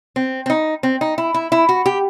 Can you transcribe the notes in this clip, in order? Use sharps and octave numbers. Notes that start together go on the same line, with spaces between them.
C4
C4
D#4
C4
D#4
E4
E4
E4
F#4
G4